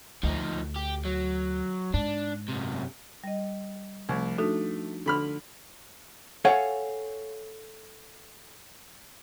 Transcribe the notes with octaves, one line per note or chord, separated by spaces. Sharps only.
D2 F3 D#4
G4
F#3
G#2 D4
F#2 C3
G3 D#5
C2 F3 A3
A3 D4 D#4 F#4
D3 B5 C6 F6
A4 C#5 F5 F#5 G#5